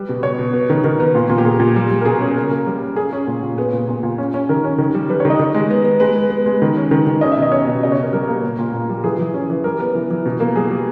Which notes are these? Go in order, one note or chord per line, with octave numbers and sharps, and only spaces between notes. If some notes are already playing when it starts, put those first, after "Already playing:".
Already playing: G3 B4
B2
B2 C#5
B2
B3
D#3
D#3 A#4
B3
A#2
A#2
G4
A#2 G#4
A#2
G3
G3
A#4
B2 G#4
C#4
C#3 A#4
A#3
G3
C#4
C#4 G#4
C#4
A#2
A#2
B3 G#4
A#2
A#2
A#2
C#4
C#4
D#3 A#4
C#4
D#3
G3
G3 B4
C#5
D#3
D#5
D#3
G#3
B3
B3
G#3 B4
B3
B3
G#3
D#3
C#4
D#3
D#3
C#4 D#5
E5
B2 D#5
C#4 C#5
B2 D#5
C#3 D#5
C#5
C#3 A#4
G3 A#4
A#3
A#2
A#2
A#2
G3
E3 G#4
E3
C#4
E3
G3 A#4
B3
E3
E3
B2
A#3
G3 G#4
G3